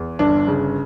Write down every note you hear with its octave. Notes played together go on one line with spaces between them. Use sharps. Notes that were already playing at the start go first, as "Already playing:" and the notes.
Already playing: E2
G1 D4
C#3